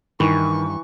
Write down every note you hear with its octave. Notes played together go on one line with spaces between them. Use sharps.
G2 D#3 E3 C#6